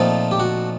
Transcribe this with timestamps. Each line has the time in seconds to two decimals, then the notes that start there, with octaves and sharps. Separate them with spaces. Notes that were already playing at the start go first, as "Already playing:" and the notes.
Already playing: A#2 F3 A3 C4 D#4 F4
0.31 G4
0.40 F#4